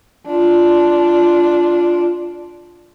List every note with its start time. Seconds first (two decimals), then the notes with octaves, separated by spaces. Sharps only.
0.27 D4 F4